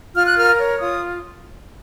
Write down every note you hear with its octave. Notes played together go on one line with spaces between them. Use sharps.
F4 F6
F#6
A#4 F6
C#5
F4 D#6